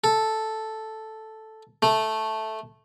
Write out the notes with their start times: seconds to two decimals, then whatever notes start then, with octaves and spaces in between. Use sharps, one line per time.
0.04 A4
1.82 A3